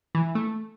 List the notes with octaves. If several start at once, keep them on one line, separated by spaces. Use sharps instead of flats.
E3
A3